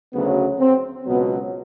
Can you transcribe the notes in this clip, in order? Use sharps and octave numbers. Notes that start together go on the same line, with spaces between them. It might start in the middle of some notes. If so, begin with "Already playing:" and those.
D2 C#3 F#3 B3
C4
C#2 B2 F#3 B3